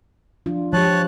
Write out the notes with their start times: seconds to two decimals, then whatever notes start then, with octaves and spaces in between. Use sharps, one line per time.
0.46 F3 D4 F4
0.73 F3 G#3 G4 C#5 A5 F#6